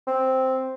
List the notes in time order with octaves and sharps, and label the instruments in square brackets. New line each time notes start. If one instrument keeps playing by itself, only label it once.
[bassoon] C4